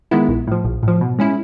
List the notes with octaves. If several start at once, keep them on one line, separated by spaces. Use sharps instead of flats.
D#3 G#3 B3 E4
A#1
A2 F3
A#1
A2 F3
B2
G#3 C#4 E4